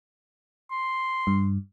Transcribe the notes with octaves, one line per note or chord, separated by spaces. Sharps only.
C6
G2